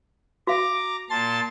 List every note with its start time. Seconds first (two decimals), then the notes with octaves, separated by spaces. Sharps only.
0.47 F#4 F5 A#5 D6
1.10 A#2 A5 C6 A6